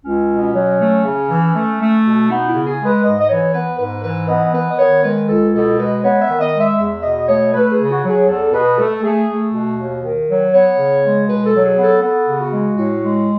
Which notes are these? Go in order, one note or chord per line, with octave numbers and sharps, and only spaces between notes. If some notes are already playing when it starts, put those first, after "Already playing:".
C#2 C#4
B2
C#4
F#3
A3
C#3
E3
A3
A3
B2
B3 D#4
E4
C#3
G#4
G#3
B4
G#2 D#5
D#5
E3 C#5
B3 B4
G#2 B4
E3 B4
B3 D#5
B3 B4
D#5
D#3 C#5
G#3 B4
C#2 A4
B2 A4
G#3 B4
B3 C#5
E5
D#3
D#5
G#3
E5
E2 E5
B2 D#5
A3 C#5
A3 B4
G#4
C#3
F#4
F#3
G#4
E2 A4
B2 B4
A3 A4
A3 G#4
A3
B2
D#2
D#3
F#3
B3 C#5
C#3
G#3
B2 B4
A4
F#3
G#4
B3
A4
B3 A4
C#3
F#4
G#3
A2 F#4
G#3